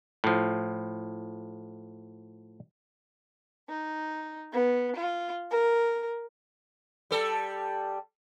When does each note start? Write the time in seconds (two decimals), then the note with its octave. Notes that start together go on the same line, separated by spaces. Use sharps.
0.24 A2 F3
3.68 D#4
4.51 B3
4.94 F4
5.50 A#4
7.11 G3 A4